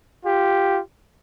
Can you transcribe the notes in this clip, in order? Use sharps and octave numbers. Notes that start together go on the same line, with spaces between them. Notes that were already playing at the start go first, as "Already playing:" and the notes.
F4 G4